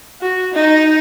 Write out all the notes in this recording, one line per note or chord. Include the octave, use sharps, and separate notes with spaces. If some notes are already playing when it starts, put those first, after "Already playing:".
F#4
D#4